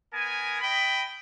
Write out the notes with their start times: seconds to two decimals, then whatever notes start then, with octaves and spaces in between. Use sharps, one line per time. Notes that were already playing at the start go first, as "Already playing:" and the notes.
0.13 B3 A#4 G#5
0.61 D#5 G5 B5